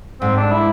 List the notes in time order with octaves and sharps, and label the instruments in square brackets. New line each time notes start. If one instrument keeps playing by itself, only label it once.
[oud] G#2 [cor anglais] C4
[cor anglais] D4
E4